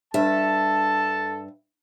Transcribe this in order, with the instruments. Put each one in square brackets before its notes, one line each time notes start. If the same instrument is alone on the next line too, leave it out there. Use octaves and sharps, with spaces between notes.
[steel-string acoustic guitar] G2 E5 [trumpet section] A4 A5